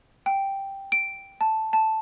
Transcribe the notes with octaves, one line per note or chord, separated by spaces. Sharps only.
G5
D7
A5
A5